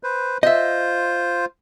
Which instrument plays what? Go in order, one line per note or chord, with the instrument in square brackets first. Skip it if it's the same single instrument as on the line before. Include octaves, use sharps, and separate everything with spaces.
[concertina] B4 C5
[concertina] F4 C5 [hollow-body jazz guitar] D#5 E5